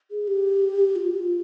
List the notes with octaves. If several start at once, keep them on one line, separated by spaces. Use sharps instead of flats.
G#4
G4
F4
F4